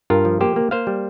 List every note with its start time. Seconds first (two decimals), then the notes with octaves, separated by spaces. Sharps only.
0.10 G2 F4 A#4
0.25 F3
0.41 A#3 G4 C5
0.56 A#3
0.71 A#3 C5 F5
0.87 G3